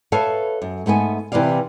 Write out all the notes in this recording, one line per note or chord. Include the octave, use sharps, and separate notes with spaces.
A4 B4 C#5 E5 F5 A5
F#2
G#2 A3 B3 G#5
C3 E3 B4 D5 F5